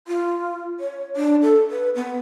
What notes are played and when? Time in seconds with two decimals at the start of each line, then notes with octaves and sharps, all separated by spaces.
0.08 F4
0.80 C#5
1.16 D4
1.42 A4
1.71 B4
1.95 B3